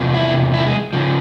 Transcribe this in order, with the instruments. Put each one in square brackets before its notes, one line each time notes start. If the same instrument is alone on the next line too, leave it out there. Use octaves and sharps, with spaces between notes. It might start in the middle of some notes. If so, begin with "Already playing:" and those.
Already playing: [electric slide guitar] E2 C3 F3
E4
E4
G#3
C#3 F3